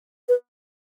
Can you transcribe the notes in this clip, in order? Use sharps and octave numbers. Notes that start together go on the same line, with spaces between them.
B4